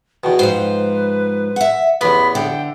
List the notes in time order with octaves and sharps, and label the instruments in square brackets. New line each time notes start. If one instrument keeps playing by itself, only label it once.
[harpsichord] E2 B2 [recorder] G5
[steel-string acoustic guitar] G#2 F3 [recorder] B4 [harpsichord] C5 G5 C6
[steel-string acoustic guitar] E5 F#5
[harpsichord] A1 E2 B3 [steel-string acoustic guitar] E3 [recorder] B5
[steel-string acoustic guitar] D3 [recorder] G5